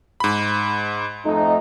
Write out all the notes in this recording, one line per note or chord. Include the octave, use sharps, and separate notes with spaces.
G#2 B5
F2 A3 D#4